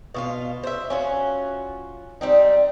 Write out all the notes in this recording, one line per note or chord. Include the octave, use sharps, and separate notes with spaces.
B2 F4 F5
C5 E5
C#4 F4 F#4
G3 C4 D#4